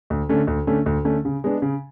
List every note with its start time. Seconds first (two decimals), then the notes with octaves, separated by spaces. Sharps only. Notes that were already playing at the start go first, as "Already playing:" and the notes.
0.10 D2
0.29 D3 A3 C#4
0.47 D2
0.67 D3 A3 C#4
0.86 D2
1.05 D3 A3 C#4
1.25 C#3
1.44 G#3 B3 D4
1.62 C#3